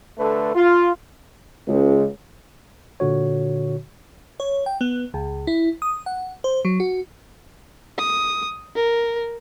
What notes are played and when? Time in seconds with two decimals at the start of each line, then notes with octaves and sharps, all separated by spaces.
0.18 D3 A3 A4 B4
0.53 F4
1.67 C#2
3.00 A#2 D3 F#4 C#5
4.40 C#5
4.66 G5
4.81 B3
5.14 C#2
5.47 E4
5.82 D#6
6.06 F#5
6.44 C5
6.65 F#3
6.80 F#4
7.98 D#6
8.76 A#4